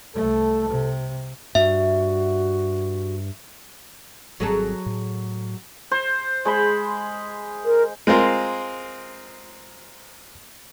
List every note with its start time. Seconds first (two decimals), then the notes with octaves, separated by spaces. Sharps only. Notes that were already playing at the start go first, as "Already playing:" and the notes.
0.15 C2 A3 A4
0.69 C3
1.55 G2 F#4 E5
4.40 G#1 F#3 G3 C4 G#4 A4
4.86 A2
5.91 C5
6.45 G#3 C5 B5
7.65 A#4
8.07 G#3 C4 F4 A#4